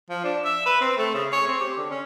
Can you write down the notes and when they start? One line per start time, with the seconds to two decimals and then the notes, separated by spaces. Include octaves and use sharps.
0.10 F3
0.24 D4
0.44 E5
0.66 B4
0.81 C4
0.98 A3
1.14 C#3
1.32 C#5
1.47 C4
1.60 G4
1.77 D3
1.90 C#4